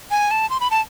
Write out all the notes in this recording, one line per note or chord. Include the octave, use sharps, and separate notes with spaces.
G#5
A5
C6
B5
A5